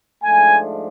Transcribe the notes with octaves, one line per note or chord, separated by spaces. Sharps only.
G#2 F3 A3 D4 G#5